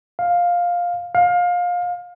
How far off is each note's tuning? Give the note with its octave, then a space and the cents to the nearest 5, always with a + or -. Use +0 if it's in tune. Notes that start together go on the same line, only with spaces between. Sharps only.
F5 +10
F5 +25